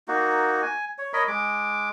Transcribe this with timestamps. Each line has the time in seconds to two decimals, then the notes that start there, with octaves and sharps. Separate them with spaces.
0.08 A#3 D#4 F#4
0.62 G#5
0.98 C#5
1.13 A#4 C#5 D#5 B5
1.28 G#3 D6